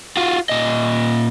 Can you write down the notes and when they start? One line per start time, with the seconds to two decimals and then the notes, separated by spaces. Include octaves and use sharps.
0.17 F4 F#4
0.49 A#2 D#5